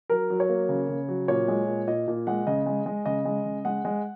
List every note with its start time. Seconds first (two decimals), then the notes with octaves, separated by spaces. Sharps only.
0.10 F#3 A#4
0.30 F#3
0.40 C#5
0.49 A#3
0.69 C#3
0.89 C#3
1.09 F#3
1.28 A#2 C#5
1.48 G#3
1.68 A#2
1.87 A#2 D#5
2.08 A#2
2.27 G#3 F#5
2.47 C#3 D#5
2.66 G#3
2.86 G#3
3.06 C#3 D#5
3.25 G#3
3.45 C#3
3.65 G#3 F#5
3.85 G#3